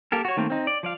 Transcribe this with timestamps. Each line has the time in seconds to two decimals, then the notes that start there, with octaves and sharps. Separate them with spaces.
0.12 A#3 G4 A4 A#4
0.25 F#4 C#5
0.37 D#3 A3 A#3 C4
0.50 C4 D#4
0.67 D5
0.83 F3 D5 F5